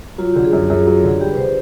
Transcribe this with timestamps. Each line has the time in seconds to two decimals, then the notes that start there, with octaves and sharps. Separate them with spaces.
0.18 F#3 F4
0.33 D3 G4
0.44 G#4
0.53 F#2
0.70 F#2 G#4
0.87 F#3
1.04 D3
1.09 G#4
1.21 G3 G4
1.32 B4
1.37 D3 C5